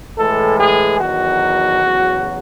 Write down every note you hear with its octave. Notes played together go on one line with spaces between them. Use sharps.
A2 E3 G#3 A4
G#4
E2 D#3 F#3 F#4
E2 C#3 F#3